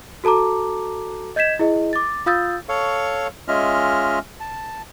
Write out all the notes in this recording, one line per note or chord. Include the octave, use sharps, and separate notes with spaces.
F#4 A4 A5 A#5 D6
D#5 G6 G#6 B6 E7
E4 G#4 D#5
D6 A6
F4 F5 D#6 E6 G6 A6
A4 C#5 F5 C#6
G#3 C#4 F4 D#5 E5 F6
A5